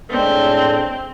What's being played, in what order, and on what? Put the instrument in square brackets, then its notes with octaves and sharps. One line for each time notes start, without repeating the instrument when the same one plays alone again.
[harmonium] A2 G#3 D4 [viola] C4